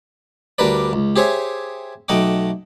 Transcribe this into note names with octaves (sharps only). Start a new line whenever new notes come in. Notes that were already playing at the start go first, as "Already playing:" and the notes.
D2 G3 D4 A#4 B4 D5
C#2
G4 G#4 C5 C#5 E5
B1 A3 D#5 F#5 G5 D6